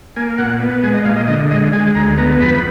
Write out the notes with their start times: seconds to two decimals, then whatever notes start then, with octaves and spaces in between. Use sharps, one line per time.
0.16 A#3 G#5
0.38 A#2 F#5
0.60 B3
0.83 G#3 G#5
0.94 D#5
1.05 A#2 F5
1.16 D#5
1.28 D3 D#5
1.51 G#3 D#5
1.73 G#3 G#5
1.95 D2 A#5
2.17 B3 A#5
2.41 F2 B5